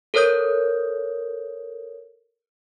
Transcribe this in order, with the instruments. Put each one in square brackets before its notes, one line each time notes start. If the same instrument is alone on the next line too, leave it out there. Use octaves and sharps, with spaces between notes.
[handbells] A4 A#4 C5 C#5 D#6 G6